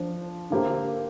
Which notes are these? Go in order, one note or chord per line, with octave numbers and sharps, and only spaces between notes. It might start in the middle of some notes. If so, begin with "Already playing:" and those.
Already playing: F3 D4 F4 C5
D3 A#3 G4 C5